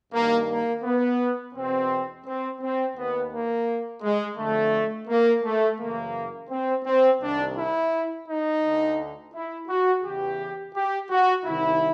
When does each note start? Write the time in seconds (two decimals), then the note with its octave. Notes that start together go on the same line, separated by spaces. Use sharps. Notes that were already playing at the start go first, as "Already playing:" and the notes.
0.13 G2 D#3 A#3
0.49 A#3
0.84 B3
1.55 E2 B2 C4
2.26 C4
2.61 C4
2.96 D#2 D#3 B3
3.32 A#3
4.03 G#3
4.37 F2 D3 A3
5.08 A#3
5.43 A3
5.79 F#2 C#3 E3 A#3
6.50 C4
6.85 C4
7.21 C2 C3 D#3 D4
7.56 E4
8.27 D#4
8.62 D2 D3
9.33 E4
9.68 F#4
10.03 E2 C#3 E3 G4
10.75 G4
11.10 F#4
11.45 C2 C3 D#3 E4